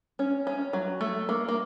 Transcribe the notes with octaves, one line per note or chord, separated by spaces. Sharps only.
C#4
C#4
F#3
A3
A#3
A#3